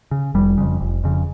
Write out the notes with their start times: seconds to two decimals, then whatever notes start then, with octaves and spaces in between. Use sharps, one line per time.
0.11 C#3
0.35 F1 G3
0.57 F2 C#3
0.81 F1
1.04 F2 C#3